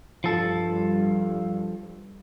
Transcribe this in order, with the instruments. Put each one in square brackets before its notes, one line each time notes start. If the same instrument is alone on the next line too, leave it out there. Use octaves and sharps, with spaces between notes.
[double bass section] G2 [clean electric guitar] F3 A4